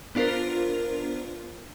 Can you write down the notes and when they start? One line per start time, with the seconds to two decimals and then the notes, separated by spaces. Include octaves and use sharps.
0.15 B3 D4 F4 A#4 C5